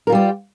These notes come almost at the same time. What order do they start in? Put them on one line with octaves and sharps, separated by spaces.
A#4 F4 G3 G4